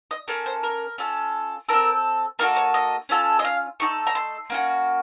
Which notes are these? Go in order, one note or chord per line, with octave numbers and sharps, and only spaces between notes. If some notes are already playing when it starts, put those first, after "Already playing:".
D#5
A#3 C#4 A4
C5
A#4
C#4 F4 A4
C4 D#4 A4 A#4
A#3 D#4 F#4 A4 A#4
C#5
D#5
C#4 F4 A4
D#5
F5
A3 D#4 A4 C#6
A#5
C6
A#3 C#4 F#4